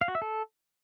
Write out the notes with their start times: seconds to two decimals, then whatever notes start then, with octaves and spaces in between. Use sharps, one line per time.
0.01 F5
0.08 F#4
0.15 E5
0.22 A4